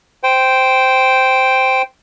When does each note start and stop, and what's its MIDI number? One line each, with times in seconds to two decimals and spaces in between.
0.23 1.82 72
0.23 1.82 79